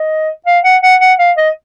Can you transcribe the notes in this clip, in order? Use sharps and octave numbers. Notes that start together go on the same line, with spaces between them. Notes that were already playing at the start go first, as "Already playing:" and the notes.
Already playing: D#5
F5
F#5
F#5
F#5
F5
D#5